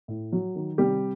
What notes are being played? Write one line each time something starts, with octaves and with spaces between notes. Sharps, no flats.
A2
F#3
D#3
C3 G3 G4